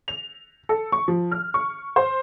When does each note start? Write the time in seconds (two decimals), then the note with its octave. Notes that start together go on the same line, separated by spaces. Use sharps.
0.08 F7
0.69 A4
0.92 C#6
1.08 F3
1.31 F6
1.54 C#6
1.96 C5